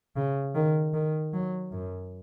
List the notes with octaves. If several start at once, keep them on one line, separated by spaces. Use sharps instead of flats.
C#3
D#3
D#3
F#3
F#2